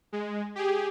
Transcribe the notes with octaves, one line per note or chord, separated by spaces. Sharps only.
G#3
G4 G#4